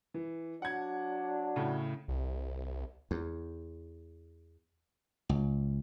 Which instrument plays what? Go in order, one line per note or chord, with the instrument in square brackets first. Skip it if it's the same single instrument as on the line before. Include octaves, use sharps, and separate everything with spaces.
[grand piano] E3
[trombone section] F#3 D4 [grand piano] F#5 G#6
[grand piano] A2 C#3
[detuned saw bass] C2
[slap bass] E2
C#2